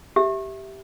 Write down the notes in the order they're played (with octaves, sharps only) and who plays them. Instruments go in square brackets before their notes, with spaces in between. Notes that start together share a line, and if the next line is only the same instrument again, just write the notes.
[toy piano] G4 E5